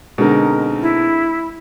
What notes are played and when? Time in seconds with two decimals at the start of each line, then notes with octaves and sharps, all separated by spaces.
0.18 B2 D3 G#3 C4 D#4 A#4
0.81 E4